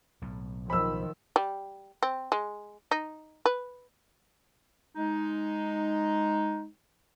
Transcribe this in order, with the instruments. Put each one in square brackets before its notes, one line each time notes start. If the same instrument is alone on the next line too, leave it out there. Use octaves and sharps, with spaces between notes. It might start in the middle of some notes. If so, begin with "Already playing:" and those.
[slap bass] B1 A2
[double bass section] D#3 F3 [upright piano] B5 E6
[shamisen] G3
C4
G#3
D#4
B4
[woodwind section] G#3 D#4